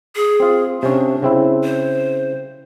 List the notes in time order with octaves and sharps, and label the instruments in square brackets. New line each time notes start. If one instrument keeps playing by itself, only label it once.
[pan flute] G#4
[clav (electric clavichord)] C4 F4
[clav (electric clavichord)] C3 C#4 [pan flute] D4
[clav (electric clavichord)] C#3 C4 E4
[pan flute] C5